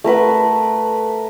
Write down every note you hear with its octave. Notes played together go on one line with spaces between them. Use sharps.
A3 A#4 B4 F#5